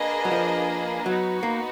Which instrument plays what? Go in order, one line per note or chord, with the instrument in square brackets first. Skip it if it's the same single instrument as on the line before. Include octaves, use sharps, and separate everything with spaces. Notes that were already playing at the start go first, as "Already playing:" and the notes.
Already playing: [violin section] A#3 D4 G#4 B4 D#5
[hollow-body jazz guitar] F#3
F3
[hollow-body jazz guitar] F#3 [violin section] B3 D#4 F#4 B4
[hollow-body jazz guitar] A#3